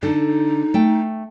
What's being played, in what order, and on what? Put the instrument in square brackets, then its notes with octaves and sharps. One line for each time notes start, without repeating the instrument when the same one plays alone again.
[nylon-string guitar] D3 A4 [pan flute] D#4
[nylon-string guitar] A3 G5